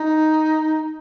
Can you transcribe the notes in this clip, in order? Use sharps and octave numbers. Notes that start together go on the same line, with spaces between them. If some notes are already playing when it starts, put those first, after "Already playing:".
Already playing: D#4